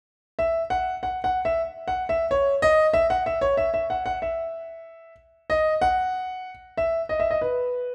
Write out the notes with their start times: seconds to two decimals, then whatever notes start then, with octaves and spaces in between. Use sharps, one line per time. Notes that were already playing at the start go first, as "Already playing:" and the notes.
0.39 E5
0.70 F#5
1.03 F#5
1.24 F#5
1.45 E5
1.88 F#5
2.09 E5
2.31 C#5
2.62 D#5
2.93 E5
3.10 F#5
3.26 E5
3.41 C#5
3.57 E5
3.74 E5
3.90 F#5
4.06 F#5
4.22 E5
5.50 D#5
5.81 F#5
6.78 E5
7.09 D#5
7.20 E5
7.31 D#5
7.41 B4